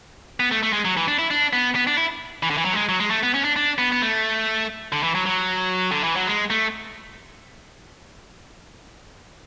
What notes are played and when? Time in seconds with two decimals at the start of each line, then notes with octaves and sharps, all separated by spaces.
0.40 B3
0.51 A3
0.63 A3
0.73 G#3
0.85 F#3
0.97 E3
1.08 D4
1.19 E4
1.31 D4
1.53 B3
1.75 B3
1.87 D4
1.97 E4
2.43 E3
2.50 D3
2.58 E3
2.65 F#3
2.73 A3
2.77 G#3
2.89 F#3
3.00 G#3
3.10 A3
3.23 B3
3.34 C#4
3.44 D4
3.56 D4
3.78 B3
3.92 B3
4.02 A3
4.92 D3
5.03 E3
5.15 F#3
5.26 F#3
5.92 D3
6.04 E3
6.16 F#3
6.27 G#3
6.50 A3